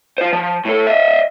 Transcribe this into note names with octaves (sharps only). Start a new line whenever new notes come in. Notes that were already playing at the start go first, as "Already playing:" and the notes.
F4 C5
F3
A2 A4
D#5 E5